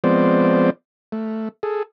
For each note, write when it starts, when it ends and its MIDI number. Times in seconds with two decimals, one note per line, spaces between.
0.04 0.70 53
0.04 0.70 56
0.04 0.70 59
0.04 0.70 60
0.04 0.70 72
0.04 0.70 74
1.12 1.49 57
1.63 1.83 68
1.63 1.83 69